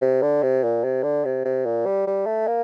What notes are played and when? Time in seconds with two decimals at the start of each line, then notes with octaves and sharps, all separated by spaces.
0.01 C3
0.22 D3
0.43 C3
0.64 A#2
0.84 C3
1.03 D3
1.25 C3
1.45 C3
1.66 A#2
1.86 G3
2.07 G3
2.26 A3
2.47 A#3